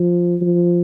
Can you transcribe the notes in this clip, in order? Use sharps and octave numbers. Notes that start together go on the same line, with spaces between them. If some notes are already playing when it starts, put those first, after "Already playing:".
Already playing: F3
F3